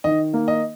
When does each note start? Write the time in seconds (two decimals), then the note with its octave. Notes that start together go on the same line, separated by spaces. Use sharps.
0.04 D#3 D#5
0.34 A#3
0.48 D#5